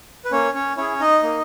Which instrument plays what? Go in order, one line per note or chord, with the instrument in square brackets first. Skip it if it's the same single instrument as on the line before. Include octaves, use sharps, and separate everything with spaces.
[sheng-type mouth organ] B4
A#3 C#4 C#5
C#4 C#5
C#4 E4 G#4 C#5
D#4 D#5
A#3